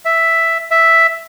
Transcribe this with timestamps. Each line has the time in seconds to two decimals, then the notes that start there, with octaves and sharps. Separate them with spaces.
0.05 E5
0.71 E5